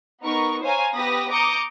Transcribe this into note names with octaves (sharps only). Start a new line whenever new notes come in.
B3 D#4 A#4 C#6
C5 C#5 F5 G#5 A#5
B3 G4 B4 B5 D#6 A#6
A#5 D6 D#6 G6 C#7